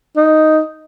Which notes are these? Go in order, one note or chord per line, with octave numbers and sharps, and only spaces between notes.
D#4